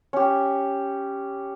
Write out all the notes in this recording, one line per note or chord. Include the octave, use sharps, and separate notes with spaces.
C#4 G4